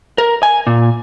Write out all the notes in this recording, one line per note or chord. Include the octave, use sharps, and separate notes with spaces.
A#4
G#5
A#2